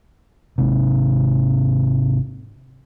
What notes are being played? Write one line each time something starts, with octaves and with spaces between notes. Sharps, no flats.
G#1 C3